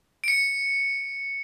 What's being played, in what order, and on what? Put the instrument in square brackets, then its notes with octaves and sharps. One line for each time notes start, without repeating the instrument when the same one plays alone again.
[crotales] C#7 D7